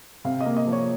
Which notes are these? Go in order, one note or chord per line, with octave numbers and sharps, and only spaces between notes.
C3 F5
D#5
A#3
D#5
F3 C#5